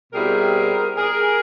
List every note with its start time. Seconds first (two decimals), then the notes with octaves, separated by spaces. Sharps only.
0.13 B2 G3 C4 E4 G#4 A#4
0.96 G#4 A#4